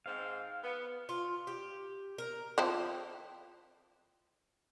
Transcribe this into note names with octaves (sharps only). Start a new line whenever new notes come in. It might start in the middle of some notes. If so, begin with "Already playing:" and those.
G#2 C4 F5
B3
F4
G4
A#4
F3 C4 E4